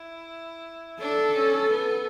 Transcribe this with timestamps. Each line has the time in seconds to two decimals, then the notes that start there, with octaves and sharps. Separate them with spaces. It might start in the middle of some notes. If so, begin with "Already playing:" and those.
Already playing: E4
1.00 D4 A4
1.34 C#4
1.69 B3